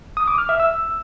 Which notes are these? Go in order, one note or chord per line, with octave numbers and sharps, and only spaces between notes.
D#6
D6
F6
E5
E6